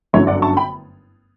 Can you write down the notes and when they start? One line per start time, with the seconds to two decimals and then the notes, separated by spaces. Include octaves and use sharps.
0.13 G1 F#2 D3 F#3 C#5 E5
0.27 D5 F#5
0.42 A5 C#6
0.57 G5 B5